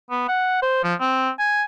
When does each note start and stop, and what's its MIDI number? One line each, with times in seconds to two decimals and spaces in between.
0.11 0.24 59
0.28 0.57 78
0.62 0.82 72
0.83 0.94 53
1.00 1.30 60
1.39 1.63 80